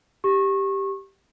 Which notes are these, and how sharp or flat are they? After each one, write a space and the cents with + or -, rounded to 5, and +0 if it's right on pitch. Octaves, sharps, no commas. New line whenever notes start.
G4 +0 C#6 -25